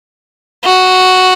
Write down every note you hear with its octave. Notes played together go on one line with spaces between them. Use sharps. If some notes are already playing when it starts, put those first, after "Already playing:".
F#4